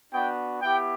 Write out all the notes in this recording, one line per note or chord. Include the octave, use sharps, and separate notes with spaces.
B3 D4 F#4 G5
B3 E4 G4 G5